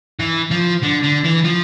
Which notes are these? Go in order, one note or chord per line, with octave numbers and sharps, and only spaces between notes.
E3
F3
D3
D3
E3
F3